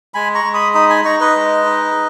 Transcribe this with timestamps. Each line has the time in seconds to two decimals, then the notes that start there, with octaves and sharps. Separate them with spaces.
0.14 G#3 G#5 B5
0.35 A#5 C#6
0.44 G#3
0.54 B5 D#6
0.74 D#4 B5 D#6
0.89 G#5 B5
1.04 D#4 A#5 C#6
1.20 B4 D#5
1.35 G#3
1.65 D#4